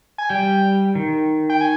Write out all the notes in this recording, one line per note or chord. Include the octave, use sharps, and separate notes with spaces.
G#5
G3 G5
D#3
G5
G#5